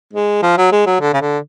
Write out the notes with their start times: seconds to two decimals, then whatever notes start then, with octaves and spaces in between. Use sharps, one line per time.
0.13 G#3
0.43 F3
0.58 F#3
0.72 G#3
0.86 F#3
1.01 D3
1.14 C#3
1.21 D3